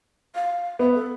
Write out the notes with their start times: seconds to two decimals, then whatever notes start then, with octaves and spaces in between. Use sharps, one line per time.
0.35 F5
0.79 B3 E5
0.95 A4